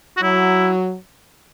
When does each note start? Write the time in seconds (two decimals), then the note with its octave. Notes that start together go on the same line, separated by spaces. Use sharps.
0.17 F#4
0.22 F#3 E4